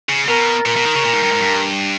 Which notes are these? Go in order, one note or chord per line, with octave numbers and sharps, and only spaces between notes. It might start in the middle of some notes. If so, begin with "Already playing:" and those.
C#3
B2 A#4
A#2 A#4
B2
D#3
C#3
A#2
G#2
G2
G#2
G2